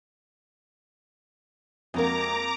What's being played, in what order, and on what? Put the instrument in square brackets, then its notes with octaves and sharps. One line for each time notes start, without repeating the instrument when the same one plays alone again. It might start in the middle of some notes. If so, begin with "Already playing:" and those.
[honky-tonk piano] F2 A#3 [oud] G#3 F#4 A#4 [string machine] A#5 D6